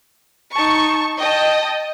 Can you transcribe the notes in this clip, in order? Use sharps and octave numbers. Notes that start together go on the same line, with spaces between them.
D#4 A5 C#6
D#5 G5 A5